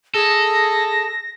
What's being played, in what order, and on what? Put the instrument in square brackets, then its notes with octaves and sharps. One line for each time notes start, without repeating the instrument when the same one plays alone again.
[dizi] G#4 [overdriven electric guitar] A4 [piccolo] A#6